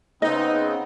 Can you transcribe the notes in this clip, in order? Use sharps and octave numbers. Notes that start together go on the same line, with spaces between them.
C#3 B3 C4 D#4 D#5